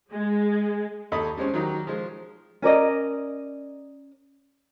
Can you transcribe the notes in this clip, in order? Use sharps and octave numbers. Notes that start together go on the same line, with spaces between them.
G#3
D#2 A4 C#5 D#5 B5 D#6
G3 G#3 C4 C#4
D#3 F#3 D#4 G4
F3 G#3
C#4 A#4 D5 D#5